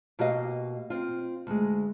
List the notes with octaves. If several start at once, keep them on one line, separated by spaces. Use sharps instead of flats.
B2 A#3 F#4 G4 D#5 F5
C4 F4
D2 G#3